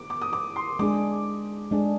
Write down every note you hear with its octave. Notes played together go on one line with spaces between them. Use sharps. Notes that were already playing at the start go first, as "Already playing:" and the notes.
Already playing: D6
D6
D#6
D6
C6
G#3 D4 G#4 D6
G#3 D4 G#4